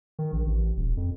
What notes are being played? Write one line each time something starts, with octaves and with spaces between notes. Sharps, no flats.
D#3
A#1
A1
D#1
F2